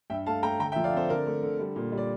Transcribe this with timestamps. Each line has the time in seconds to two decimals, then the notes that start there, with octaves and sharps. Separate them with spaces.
0.10 G2 E5 G5
0.26 A3 F5 A5
0.43 A3 G5 A#5
0.59 D3 G5 A#5
0.72 E5 G5
0.76 F3
0.84 D5 F5
0.93 C4 A4 C5
1.09 D3 A#4 D5
1.26 A3
1.43 D3
1.60 G3
1.76 A#2
1.92 G3
1.98 D5